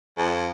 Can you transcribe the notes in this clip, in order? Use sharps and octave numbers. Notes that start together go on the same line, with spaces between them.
F2